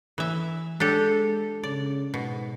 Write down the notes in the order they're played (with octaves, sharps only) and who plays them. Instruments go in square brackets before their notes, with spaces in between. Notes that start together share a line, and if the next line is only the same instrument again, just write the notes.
[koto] E3 E5
[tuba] G#3 [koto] D4 G4 A4
[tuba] C#3 [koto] D5
[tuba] G#2 [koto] B2